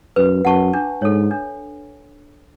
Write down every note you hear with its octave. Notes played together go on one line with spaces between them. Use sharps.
F#2 B4
F#2 F#5 A5 C#6
D4
G#2 A4 C#5
D4